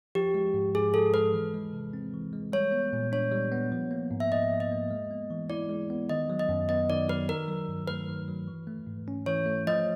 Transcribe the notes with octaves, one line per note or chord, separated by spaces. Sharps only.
F3 G4
G#3
G#2
G#2 G#4
F3 A4
G#3 B4
E3
G#3
C3
C4
E3
G#3
G3 C#5
B3
A#2
D4 C#5
G3
B3
F3
A#3
G#2
E5
G#2 D#5
F3
D#5
A#3
G#3
B3
E3
E4 D5
G#3
B3
D#3 D#5
F#3
D#5
F#2
B3 D#5
D#3 D5
F#3 B4
D#3 A#4
F#3
G2
A3 B4
D#3
F#3
E3
A3
G#2
C#4
E3 C#5
A3
F3 D#5